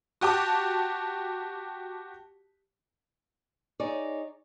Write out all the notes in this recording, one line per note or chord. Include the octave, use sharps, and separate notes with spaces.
F#4 G4 A5 D6
D#4 G#4 C#5 D5